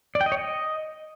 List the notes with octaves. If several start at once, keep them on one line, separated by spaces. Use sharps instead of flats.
D5
G5
D#5
C#5
D#5